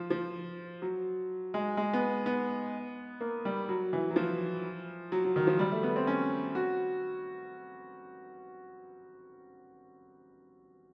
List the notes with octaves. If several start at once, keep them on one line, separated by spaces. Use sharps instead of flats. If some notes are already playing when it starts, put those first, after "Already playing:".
Already playing: F3
F3
F#3
G#3
G#3
B3
B3
A#3
G3
F#3
E3
F#3
F3
F#3
F#3
D#3
F3
G3
A3
B3
C4
C#4
F#4